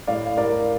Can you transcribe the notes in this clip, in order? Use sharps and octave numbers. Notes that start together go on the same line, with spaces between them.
A2 D5 F5
A2 A#4 D5